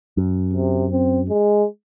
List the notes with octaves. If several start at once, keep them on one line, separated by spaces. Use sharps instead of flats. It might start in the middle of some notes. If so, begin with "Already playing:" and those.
F#2
C3
C4
G#3